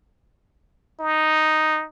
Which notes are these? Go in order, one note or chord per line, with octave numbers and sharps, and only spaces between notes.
D#4